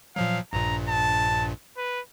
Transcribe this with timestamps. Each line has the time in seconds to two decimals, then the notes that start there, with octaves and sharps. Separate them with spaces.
0.16 A#2 F3 F#3 F5
0.53 A#1 G2 A#2 A#5
0.89 A5
1.77 B4